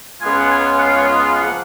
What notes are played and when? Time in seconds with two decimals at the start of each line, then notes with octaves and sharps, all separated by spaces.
0.21 C#2 C#3 G#3 B3 F4 G#5
0.35 F#5
0.49 G#5
0.76 F#5
0.81 F5
0.95 C#5
1.11 D#5
1.26 F5
1.41 F3 A#3 F#5